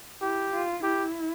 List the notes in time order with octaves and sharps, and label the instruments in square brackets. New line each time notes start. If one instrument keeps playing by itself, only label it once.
[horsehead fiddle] E4 [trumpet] G4
[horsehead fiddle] F4
[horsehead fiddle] E4 [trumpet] G4